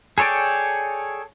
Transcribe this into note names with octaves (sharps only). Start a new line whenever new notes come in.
G#4 A4 C#5 D5 G5